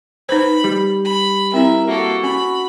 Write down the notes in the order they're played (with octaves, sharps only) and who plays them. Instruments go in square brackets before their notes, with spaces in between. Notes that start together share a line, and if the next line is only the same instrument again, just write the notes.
[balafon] D#4 B4 C5 [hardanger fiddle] B5
[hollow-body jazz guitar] G3
[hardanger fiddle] B5
[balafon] C4 E4 [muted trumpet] A#4 [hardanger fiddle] E5
[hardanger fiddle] A#3 A4 [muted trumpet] F#4
[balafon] C#4 [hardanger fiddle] B5